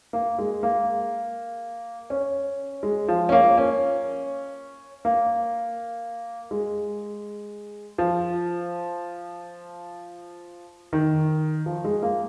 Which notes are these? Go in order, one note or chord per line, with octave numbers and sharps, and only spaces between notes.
A#3
G#3
A#3
C#4
G#3
F3
C#4
A#3
C#4
A#3
G#3
F3
D#3
F3
G#3
A#3